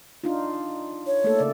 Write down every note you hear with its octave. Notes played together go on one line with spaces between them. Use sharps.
D4 D#4 F4
C#5
A3 A#3 A4
C#3 D5